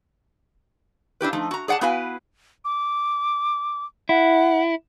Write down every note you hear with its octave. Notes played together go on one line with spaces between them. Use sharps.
D4 E4 G4 B4
F3 A3 D#4
F#4 A#5
G#4 D5 F#5 G#5 A5
B3 E4 F#4 B4 F5 G#5
D6
E4 F#5